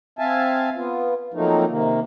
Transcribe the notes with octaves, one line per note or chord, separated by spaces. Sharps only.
C4 E5 F5 G#5 A5
B3 F4
F3 F#3 A3 A#3 C4 D#4
C3 D#3 A#3